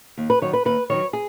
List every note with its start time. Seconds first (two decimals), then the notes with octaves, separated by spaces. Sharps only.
0.18 D#2
0.30 B4
0.42 D#3 F#3 C#5
0.53 B4
0.65 D#2 B4
0.90 D#3 F#3 C#5
1.13 G#4